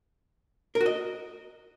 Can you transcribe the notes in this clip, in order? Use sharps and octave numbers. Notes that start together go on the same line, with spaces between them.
A#4
F#4
D#5